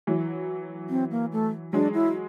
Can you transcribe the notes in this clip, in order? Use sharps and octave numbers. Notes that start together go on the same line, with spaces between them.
E3 F#3
C4
A#3
A3
F#3 G#3 D4
E4